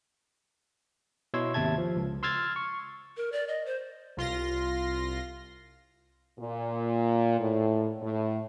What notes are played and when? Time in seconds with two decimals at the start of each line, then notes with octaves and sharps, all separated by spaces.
1.34 B2 E4 C#5 C6 E6 G#6
1.54 G#1 D#2 C3 E5 A5 G#6
1.78 F3
1.97 C#2
2.23 C6 E6 F6 G#6 A6
2.56 C#6
3.17 A#4
3.32 D5
3.48 D#5
3.66 C5
4.17 C2 F4 C6 A#6
6.39 A#2
7.40 A2
8.02 A2